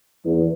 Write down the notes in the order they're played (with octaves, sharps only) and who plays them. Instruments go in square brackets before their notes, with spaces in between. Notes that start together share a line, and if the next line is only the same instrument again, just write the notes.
[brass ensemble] E2